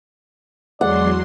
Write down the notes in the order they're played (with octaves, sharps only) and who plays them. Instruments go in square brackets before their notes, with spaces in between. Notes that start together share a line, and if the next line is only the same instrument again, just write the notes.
[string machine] E2 F#3 C6 [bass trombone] G#3 [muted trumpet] D5 [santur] F#5